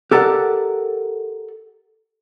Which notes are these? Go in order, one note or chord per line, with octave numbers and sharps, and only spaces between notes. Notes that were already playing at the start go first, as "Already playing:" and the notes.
G4 A4 A#4 D5 F#5